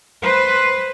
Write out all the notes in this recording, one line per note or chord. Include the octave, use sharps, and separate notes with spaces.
B4 C5